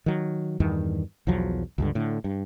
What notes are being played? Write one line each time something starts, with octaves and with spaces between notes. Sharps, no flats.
D#3 F#3
E2 G2 D#3
B1 E2 F3 F#3
C#2 G2 D3
A2 D3
G2